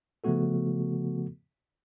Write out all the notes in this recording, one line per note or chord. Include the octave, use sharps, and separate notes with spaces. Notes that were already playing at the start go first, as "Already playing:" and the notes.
C#3 F3 A3 B3 F#4 A4